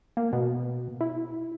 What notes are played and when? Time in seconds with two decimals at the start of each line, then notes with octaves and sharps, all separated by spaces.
0.17 A#3
0.33 B2
1.01 E4